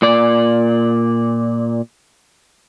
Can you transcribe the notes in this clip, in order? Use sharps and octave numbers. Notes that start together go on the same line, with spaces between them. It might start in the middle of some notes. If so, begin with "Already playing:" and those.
A#2 D5